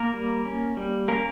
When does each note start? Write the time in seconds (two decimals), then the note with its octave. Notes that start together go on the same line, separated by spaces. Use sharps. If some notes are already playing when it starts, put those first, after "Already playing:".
Already playing: A#3 A#4
0.13 G3
0.45 C#4
0.77 G3
1.08 A#3 C#4 A#4